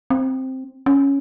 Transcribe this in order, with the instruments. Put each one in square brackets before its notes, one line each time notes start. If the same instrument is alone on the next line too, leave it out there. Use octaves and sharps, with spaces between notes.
[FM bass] C4
C#4